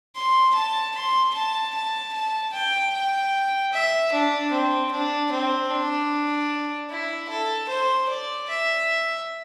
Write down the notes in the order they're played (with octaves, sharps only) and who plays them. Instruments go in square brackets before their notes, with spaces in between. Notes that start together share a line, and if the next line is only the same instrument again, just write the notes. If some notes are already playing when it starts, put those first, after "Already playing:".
[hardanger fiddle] C6
A5
C6
A5
A5
A5
G5
G5
E5
D4
C4
D4
C4
D4
E4
A4
C5
D5
E5